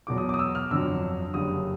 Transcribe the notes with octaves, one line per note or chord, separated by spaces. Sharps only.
E2 B2 F#3 D6
D#6
D6
D#6
E6
F6
G1 F2 D3 F#3 E6
F#1 F#2 D3 G3 D#6